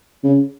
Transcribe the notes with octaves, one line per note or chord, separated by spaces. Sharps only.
C#3